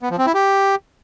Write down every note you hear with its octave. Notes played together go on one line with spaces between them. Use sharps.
B3
F3
C4
E4
G4